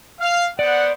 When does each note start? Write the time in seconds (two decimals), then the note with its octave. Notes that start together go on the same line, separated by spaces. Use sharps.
0.20 F5
0.59 B3 C5 D5 F#5